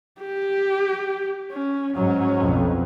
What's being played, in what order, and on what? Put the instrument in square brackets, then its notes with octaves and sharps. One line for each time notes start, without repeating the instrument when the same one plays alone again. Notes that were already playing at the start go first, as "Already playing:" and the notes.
[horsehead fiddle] G4
C#4
[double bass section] G#2 F#3 [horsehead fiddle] C#4
[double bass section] B1 F2